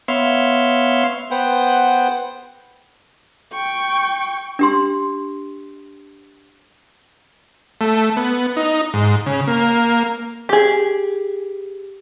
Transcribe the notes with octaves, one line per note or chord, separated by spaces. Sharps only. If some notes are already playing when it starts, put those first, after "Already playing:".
B3 C#5 E5 F5 C6
B3 B4 C5 F#5 G5
G5 C#6
D4 G4 C6
A3
B3
D#4
G#2
C#3
A#3
G4 G#4